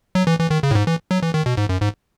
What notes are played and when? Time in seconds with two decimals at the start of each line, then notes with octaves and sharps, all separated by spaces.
0.15 F#3
0.27 E3
0.39 E3
0.51 D#3
0.63 C#3
0.71 A2
0.75 G#2
0.87 E3
1.11 F#3
1.22 E3
1.34 D#3
1.46 B2
1.57 G#2
1.69 F#2
1.81 G#2